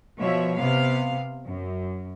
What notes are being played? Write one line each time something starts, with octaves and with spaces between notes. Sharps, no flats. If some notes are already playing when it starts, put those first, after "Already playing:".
B2 F3 C#5 E5
C3 B3 F5
F#2